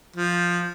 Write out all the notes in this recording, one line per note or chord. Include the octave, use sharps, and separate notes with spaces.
F3